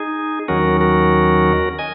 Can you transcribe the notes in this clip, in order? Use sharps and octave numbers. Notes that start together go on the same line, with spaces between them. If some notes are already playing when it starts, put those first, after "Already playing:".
Already playing: D#4 G#4
D#2 D#3 F#3 C#4 F#4 A#4
F#4 A#4
D#5 G#5